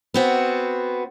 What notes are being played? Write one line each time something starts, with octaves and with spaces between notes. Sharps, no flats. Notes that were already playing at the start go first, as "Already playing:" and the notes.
B3 C4 F#4